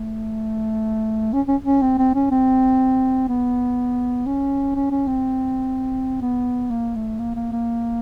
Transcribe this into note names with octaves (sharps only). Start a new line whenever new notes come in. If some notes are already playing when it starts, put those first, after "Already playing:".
Already playing: A3
C#4
C#4
C#4
C4
C4
C#4
C4
B3
C#4
C#4
C#4
C4
B3
A#3
A3
A#3
A#3
A#3